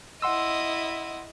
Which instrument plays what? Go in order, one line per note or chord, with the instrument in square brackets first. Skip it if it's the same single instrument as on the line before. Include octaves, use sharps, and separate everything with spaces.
[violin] E4 D#5 [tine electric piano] F#5 C6 E6